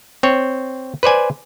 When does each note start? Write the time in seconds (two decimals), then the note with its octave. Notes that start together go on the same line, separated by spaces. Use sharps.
0.23 C4 C#5
1.03 B4 C5 D5 G#5